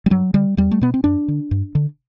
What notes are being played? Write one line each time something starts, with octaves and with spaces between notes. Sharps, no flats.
G3
G2 F#3
D3 G3
E2 G3
A3
B2 B3
C4
F#2 D4
D3
G2
D3